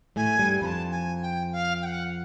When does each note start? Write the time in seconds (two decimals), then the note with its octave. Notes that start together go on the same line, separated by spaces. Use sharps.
0.16 A2 A3 G#5
0.39 G2 G3
0.61 F2 F3 A5 B5
0.91 G#5
1.22 G5
1.52 F5
1.82 G5
1.85 F#5